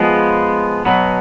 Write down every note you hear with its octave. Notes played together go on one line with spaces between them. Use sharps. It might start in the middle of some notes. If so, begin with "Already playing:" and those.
Already playing: F3 G#3 B3
B2 F#3 B3